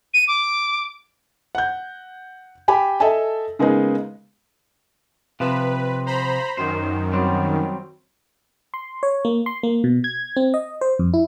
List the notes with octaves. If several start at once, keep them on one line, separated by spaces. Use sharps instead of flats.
D#7
D6
F#5 G6
G4 G5 G#5 B5
A4 D#5 E5 G#5 A5
C#3 G#3 A#3 B3 D#4 G#4
C3 F3 B4
C5 A#5 B5
F#2 D#3 C5
F#3 G3 C4
C6
C#5
A#3
C6
A#3
B2
G#6
C4
D#5
C5
F2
E4